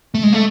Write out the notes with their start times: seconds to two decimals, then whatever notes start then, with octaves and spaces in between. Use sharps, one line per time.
0.14 A3
0.23 G#3
0.33 A3